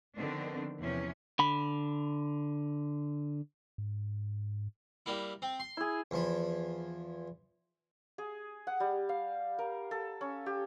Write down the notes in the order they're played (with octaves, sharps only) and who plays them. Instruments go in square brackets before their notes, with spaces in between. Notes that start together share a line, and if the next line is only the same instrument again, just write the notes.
[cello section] D3 D#3 F3 B3 C4 D4
E2 C3 F3 C#4
[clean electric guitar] D3 B5
[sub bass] G#2
[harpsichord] G3 A#3 E4
C4
C6
[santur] E4 G#4
[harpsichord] E2 F3 B5
[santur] G#4
F#5
G3
F5
A#4
A4
C#4
G4